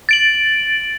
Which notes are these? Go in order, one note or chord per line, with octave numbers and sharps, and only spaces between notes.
A6 D7 F#7